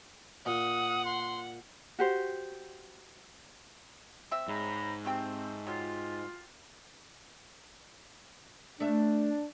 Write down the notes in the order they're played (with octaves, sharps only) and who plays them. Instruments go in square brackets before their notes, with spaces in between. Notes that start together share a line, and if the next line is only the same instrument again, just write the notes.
[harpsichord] A#2 [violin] F#5 [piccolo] D#6
[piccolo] C6
[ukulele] F#4 G4 C5
[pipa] C4 E5
[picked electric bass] G#2 [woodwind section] C#5 A#5 B5
[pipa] A3 G4 G5 [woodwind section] C4
[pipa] F#3 G4 [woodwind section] F4
[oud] A3 E5 [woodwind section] D4